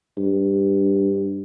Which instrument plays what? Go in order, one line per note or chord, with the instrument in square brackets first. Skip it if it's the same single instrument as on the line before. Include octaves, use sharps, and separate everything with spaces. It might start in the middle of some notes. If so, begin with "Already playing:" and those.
[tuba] G2